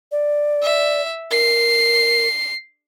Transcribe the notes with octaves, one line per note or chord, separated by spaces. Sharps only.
D5
E5
A#4 C7